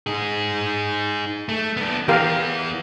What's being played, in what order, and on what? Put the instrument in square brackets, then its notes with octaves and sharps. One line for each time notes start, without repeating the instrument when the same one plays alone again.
[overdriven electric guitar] D#4 G#4
A3
B3 D4
[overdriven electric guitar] E3 B3 [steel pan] G4 A#4 F5